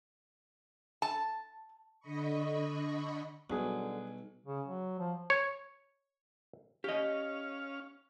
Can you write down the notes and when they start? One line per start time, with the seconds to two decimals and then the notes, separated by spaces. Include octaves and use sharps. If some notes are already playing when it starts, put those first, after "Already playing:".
1.02 A5
2.00 D3 D#5 B5 C#6
3.50 B1 D3 F#3 G3 G#4
4.46 C#3
4.68 F#3
4.99 F3
5.30 C#5
6.84 C#4 G4 D#5 F5